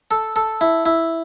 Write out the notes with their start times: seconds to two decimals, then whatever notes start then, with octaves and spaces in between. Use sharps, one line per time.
0.11 A4
0.36 A4
0.61 E4
0.86 E4